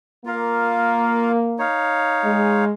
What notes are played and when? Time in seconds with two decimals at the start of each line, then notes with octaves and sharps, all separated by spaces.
0.25 A#3 F4 A#4 F5
1.58 D#4 C#5 F5
2.25 G#3